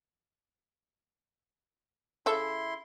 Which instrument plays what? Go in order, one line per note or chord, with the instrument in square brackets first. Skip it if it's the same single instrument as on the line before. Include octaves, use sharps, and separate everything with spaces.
[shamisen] C#3 A4 E5 [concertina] E4 C6